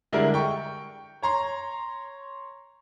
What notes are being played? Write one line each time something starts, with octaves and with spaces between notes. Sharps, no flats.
D3 G3 G#3 D4 E4 A#4
G5 C#6
C#5 A#5 C6